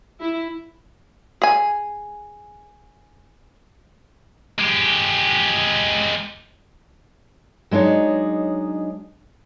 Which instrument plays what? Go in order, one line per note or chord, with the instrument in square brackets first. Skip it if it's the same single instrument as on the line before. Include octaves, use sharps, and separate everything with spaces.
[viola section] E4
[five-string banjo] G#4 G#5
[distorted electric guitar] G#3 G4
[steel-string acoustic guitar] F#3 G#3 D4 D#4 C#5